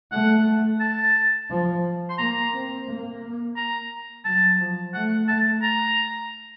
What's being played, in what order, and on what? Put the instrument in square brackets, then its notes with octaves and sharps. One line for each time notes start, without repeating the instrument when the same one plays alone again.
[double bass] A3 [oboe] F#5
[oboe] A5
[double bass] F3
[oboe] C6
[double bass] A#3 [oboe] A#5
[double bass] C4
A#3
[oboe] A#5
[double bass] F#3 [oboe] A5
[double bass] F3
[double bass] A3 [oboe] F#5
[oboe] A5
A#5